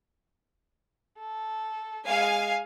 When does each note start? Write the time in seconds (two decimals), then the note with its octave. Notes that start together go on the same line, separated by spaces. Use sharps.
1.19 A4
2.07 G#3 F5 G#5